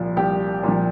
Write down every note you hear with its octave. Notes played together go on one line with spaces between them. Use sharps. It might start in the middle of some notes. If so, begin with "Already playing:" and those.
Already playing: C2 A#2 F3
C2 G4
A#2 F3